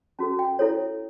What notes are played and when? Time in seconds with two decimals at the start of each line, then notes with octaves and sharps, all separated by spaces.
0.19 C#4 F#4 A4 A5
0.39 G5
0.59 E4 A4 C#5